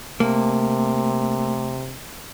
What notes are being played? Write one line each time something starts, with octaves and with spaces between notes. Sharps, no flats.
C3 A3 A#3